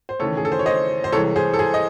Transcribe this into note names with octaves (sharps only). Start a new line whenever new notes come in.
C5
D#2 C#3 E3 A3 A4 C#5
G#4
A4
C5
C#5
C5 D#5
C5
C2 C3 E3 G#3 A4 C#5
G#4 C5
A4
G#4 C5
D#5